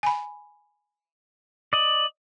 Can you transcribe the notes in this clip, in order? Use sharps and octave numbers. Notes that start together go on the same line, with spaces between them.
G#5 B5
D5 D#5 F#7